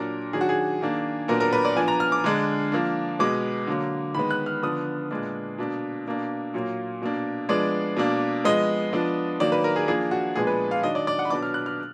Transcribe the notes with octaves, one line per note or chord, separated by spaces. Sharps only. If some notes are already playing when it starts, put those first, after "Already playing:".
Already playing: A#2 F#3 D4 A#4
D#3 F#3 D4 G#4
F#4
G#4
D#3 A#3 D4
A#2 F#3 B3 D4 A#4
A#4
B4
D5
F3 B3 D4 G#5
A#5
F6
D6
D3 G#3 D4
F3 A#3 D4
B2 G#3 B3 D6
D3 F#3 A#3
D#3 G#3 B3 B5
F#6
F6
D3 F3 B3 D4 D#6
A#2 G#3 B3 D4
B2 A#3 D4
B2 A#3 D4
A#2 F#3 A#3
B2 A#3 D4
F3 G#3 B3 D4 D5
B2 A#3 D4
F3 G#3 B3 D#5
F3 B3 D4
D#3 F#3 A#3 D5
B4
A#4
G#4
F3 A#3 D4 G#4
F#4
A#2 F3 G#3 B3 D4 G#4
B4
F5
D#3 F#3 D4 D#5
D5
D5
F#5
B5
B2 F#3 B3 D4 D6
F6
F#6
F6